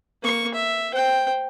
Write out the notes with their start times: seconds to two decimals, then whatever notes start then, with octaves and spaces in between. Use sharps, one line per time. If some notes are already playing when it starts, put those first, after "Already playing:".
0.22 A#3 C#6
0.54 E5
0.92 C5 G5